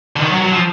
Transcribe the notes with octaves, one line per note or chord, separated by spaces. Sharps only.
D3
D#3
F#3
F#3
F3